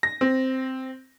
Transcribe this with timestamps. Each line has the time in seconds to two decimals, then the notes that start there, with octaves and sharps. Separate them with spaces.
0.03 A#6
0.21 C4